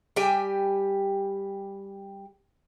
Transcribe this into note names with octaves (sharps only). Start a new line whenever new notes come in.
G3 G4 G5 G#5